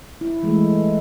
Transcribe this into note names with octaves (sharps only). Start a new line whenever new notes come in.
E4
E3 G#3 A3